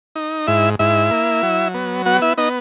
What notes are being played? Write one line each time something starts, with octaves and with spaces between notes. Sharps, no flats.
D#4
G#2 E4 E5
G#2 E4 E5
A#3
F#3
B3
B3 F#4 F#5
E4 E5
B3 D#4 D#5